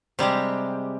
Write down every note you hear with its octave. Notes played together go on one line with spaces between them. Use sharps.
C3 G3 G#3 G4